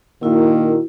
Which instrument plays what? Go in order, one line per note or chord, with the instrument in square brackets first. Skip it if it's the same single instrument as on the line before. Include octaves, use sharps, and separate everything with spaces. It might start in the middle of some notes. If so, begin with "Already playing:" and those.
[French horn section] A#2 D#3 A#3 [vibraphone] E4 F#4 A#4